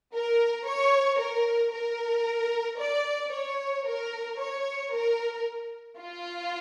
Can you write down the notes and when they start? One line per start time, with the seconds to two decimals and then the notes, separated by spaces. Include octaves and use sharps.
0.14 A#4
0.66 C#5
1.19 A#4
1.73 A#4
2.79 D5
3.33 C#5
3.86 A#4
4.39 C#5
4.93 A#4
5.99 F4